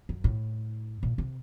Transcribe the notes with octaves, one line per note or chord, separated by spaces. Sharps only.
F#2
A2
A#2
C3